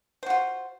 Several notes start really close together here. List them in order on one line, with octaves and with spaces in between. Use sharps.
C5 F#4 F4